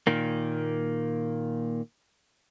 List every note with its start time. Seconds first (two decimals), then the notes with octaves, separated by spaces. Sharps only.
0.07 A#2 D#3 A#3